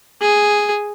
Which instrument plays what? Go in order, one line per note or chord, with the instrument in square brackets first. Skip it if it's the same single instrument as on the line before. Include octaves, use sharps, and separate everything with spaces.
[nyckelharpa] G#4